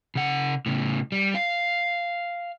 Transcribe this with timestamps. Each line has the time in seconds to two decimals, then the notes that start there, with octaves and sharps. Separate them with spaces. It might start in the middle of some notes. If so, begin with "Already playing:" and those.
0.15 C#3 F#5
0.66 A2 C#3
1.12 G3
1.35 F5